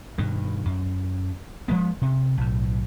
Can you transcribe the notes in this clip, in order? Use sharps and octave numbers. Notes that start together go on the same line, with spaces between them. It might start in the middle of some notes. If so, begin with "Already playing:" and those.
G2 B2 D#3
F#2
F3 G#3 B3
C3
B1 A2